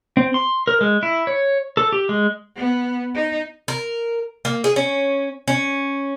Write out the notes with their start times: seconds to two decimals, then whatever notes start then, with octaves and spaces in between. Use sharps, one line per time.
0.17 C4
0.34 C6
0.67 A#4
0.81 G#3
1.03 E4
1.27 C#5
1.77 A4
1.92 G4
2.09 G#3
2.56 B3
3.15 D#4
3.68 A#4
4.45 A#3
4.64 G#4
4.76 C#4
5.48 C#4